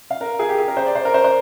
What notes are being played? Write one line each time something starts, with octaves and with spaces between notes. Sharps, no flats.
F5
A#4
G#4
G4
G#4
A#4
C5
D5
C5
A#4
C5
C5